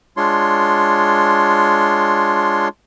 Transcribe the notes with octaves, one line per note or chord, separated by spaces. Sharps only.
G#3 D4 F4 C#5 C6